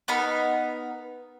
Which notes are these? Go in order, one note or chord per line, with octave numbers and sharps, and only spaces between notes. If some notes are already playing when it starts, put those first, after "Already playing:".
B3 D#4 A#4 B5